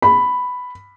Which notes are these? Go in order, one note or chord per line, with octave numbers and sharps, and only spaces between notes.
B5